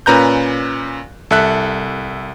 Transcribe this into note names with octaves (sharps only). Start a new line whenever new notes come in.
A#2 C#4 B4 A#5 F#6 G6
C2 A4 E5 F#6